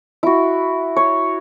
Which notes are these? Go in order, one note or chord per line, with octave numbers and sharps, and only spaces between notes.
E4 F#4
C#5